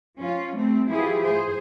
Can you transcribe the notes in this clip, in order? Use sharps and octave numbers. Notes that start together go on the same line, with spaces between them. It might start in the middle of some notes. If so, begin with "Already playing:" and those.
F3 C#4 F4
G3 A3 C4
E3 F3 E4 F4 G4 G#4
G#4 C5